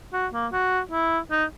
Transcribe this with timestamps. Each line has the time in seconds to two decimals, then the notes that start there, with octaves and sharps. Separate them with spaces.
0.13 F#4
0.33 A#3
0.53 F#4
0.91 E4
1.31 D#4